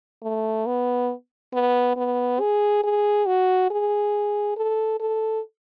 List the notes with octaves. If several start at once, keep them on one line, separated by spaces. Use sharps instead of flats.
A3
B3
B3
B3
G#4
G#4
F#4
G#4
A4
A4